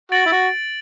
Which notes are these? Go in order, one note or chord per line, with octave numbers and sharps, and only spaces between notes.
F#4 A6 D7 F#7
E4
F#4